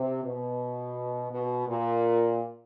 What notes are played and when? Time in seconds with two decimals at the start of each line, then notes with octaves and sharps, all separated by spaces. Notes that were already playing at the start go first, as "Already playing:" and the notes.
Already playing: C3
0.24 B2
1.31 B2
1.67 A#2